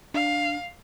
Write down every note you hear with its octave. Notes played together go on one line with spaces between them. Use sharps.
D4 F5